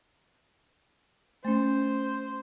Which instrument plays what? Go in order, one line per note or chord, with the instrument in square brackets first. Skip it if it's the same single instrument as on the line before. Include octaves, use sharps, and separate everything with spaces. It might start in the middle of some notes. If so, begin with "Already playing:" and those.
[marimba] A3 C#4 [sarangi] C5